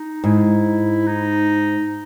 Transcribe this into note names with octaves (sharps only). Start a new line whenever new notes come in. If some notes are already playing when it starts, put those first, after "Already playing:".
Already playing: D#4
G#2 E4
D#4